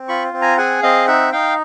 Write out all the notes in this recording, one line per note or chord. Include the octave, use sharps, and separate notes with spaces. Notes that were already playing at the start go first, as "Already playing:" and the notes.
Already playing: C4
F4 B5 C#6
C4
G#5 A#5
G#4 F#5 G#5
C4 D#5 F5
D#4 E5 F#5
D#4 F5 G5